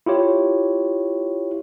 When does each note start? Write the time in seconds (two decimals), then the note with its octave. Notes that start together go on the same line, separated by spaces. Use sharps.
0.06 E4 F4 G4 C#5